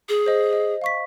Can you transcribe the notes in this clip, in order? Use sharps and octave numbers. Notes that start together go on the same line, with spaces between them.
G#4
C5 D#5
D#5
F5 C#6 B6